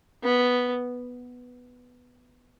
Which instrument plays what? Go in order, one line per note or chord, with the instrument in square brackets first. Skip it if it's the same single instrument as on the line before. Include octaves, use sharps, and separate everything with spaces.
[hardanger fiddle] B3